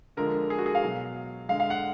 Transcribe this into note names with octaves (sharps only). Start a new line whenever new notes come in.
D3 F3 G#3 A#4
G#4
F#4
G#4
F5
B2 F#3
D3 G#3 F5
F5
F#5